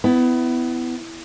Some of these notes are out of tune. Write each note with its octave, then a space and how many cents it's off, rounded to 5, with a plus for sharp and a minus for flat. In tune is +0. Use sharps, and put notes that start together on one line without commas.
B3 +25 E4 +0